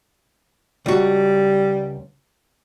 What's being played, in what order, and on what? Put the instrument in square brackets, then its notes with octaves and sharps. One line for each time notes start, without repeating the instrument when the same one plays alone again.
[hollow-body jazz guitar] C#2 F#4 [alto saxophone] G3